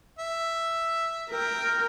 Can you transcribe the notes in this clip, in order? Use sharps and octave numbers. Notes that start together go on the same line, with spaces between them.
E5
A#4 G5